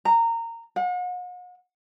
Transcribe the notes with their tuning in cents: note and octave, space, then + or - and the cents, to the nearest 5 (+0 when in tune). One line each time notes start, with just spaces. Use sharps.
A#5 -20
F#5 -45